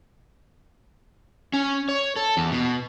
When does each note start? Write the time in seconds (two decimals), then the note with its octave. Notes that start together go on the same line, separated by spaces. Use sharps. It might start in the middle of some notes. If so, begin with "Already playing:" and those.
1.53 C#4
1.89 C#5
2.16 A4
2.37 E2
2.51 B2